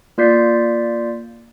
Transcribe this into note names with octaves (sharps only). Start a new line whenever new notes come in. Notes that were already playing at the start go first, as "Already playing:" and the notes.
A#3 F4 D5 G6 B6 C7